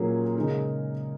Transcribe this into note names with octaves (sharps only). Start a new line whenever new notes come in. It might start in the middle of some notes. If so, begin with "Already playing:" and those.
Already playing: A#2 F#3 A#3 C#4 G#4
C#3 G#3 D#4 A#4